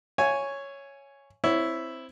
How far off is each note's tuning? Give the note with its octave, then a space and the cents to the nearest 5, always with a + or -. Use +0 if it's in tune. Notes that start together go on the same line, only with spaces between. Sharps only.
C#5 +0 E5 +45 G#5 +0
C4 +0 E4 +0 C#5 +15